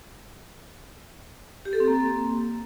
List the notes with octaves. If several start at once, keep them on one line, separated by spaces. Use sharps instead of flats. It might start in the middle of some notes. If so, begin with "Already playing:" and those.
G4
A4
C4
A#3